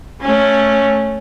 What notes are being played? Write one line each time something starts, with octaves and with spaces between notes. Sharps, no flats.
A3 C#4